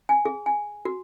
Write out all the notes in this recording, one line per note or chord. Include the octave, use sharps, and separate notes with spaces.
G#5
G#4
G#5
F#4